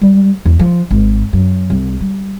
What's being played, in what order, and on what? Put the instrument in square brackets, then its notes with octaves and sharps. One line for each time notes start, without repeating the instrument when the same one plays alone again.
[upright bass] G3
E2
F3
G#1
F#2
C2
G3